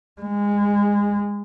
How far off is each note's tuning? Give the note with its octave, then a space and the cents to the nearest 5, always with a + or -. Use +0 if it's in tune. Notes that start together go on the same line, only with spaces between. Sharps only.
G#3 -25